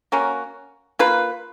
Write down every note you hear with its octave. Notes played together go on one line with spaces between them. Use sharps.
A#3 C#4 F#4
A#3 F4 B4